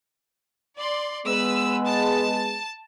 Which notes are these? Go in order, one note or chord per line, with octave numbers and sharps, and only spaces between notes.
D5 C6
G#3 B3 B4 E6
A5